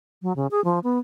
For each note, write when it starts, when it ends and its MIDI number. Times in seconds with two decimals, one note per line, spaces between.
0.22 0.33 54
0.36 0.47 49
0.51 0.63 68
0.64 0.79 53
0.84 0.99 59